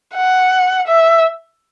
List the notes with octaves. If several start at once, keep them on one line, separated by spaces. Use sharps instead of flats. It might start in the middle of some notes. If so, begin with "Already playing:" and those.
F#5
E5